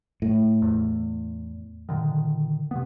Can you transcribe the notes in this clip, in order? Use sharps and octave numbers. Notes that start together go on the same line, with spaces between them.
A2
E2
A#2 D3 D#3
C3 B3